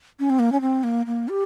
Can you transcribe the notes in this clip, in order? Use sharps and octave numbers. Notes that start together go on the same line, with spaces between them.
C#4
C4
A#3
C#4
C4
A#3
A#3
G4